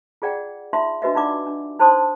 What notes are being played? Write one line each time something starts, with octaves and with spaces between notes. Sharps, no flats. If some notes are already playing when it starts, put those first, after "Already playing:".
F4 G#4 D5 F#5 G5
D#4 F4 E5 C6
D4 F#4 B4 D#5 E5
D4 D#4 F4 D5 F#5 D6
D4
D#4 C5 C#5 A5 C6 D#6